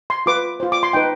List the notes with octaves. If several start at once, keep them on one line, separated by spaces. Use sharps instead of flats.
C6
F4 B4 D6
F4 C5
D6
C6
D#4 B4 G5